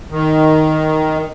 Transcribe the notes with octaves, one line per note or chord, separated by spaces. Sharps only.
D#3